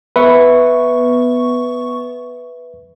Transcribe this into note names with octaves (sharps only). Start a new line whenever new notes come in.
B3 B4 E5 C#6